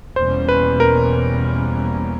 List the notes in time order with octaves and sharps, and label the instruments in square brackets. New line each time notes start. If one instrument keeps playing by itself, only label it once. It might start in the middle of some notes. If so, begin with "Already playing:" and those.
[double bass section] E2 B2 G3 A#3 C#4 [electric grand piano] C5
[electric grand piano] B4
A#4